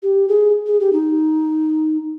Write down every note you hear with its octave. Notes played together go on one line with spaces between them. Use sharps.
G4
G#4
G#4
G4
D#4